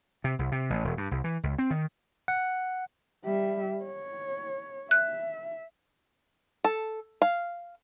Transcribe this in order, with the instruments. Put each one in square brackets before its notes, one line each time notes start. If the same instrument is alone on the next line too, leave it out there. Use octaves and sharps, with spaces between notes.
[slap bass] C3
C2
C3
A1
E1
G2
C2
E3
C#2
C4
D#3
[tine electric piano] F#5
[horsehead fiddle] G3 E5
C#5
[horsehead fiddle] E5 [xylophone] F#6
[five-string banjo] A4
F5